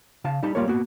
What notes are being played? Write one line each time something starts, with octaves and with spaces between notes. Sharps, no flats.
C#3 F5 A5
G3 D#4 G4 A5 B5
G3 A#3 F4 A#4 C#5
A#3 B3 F#4